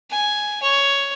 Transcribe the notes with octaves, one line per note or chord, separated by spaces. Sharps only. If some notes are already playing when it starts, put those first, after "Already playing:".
G#5
C#5